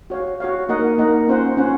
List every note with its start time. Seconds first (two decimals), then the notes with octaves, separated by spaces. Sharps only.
0.10 F#4 C#5 F5
0.40 F#4 C#5 F5
0.69 A#3 D#4 A#4 D#5 F#5
0.98 A#3 D#4 A#4 D#5 F#5
1.28 C#4 F4 C5 F#5
1.57 C#4 F4 C5 F#5